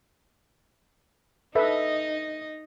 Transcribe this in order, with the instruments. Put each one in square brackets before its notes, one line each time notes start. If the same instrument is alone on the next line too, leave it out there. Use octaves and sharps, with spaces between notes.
[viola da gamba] D#4 D#5 [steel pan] A4 B4 E5